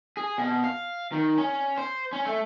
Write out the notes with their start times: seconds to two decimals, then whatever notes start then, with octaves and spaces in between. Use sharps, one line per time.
0.17 G#4
0.38 B2
0.64 F5
1.12 D#3
1.38 C#4
1.78 C5
2.13 C#4
2.26 A3